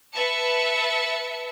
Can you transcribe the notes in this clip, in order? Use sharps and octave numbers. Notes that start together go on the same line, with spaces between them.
B4 E5 A5 C#7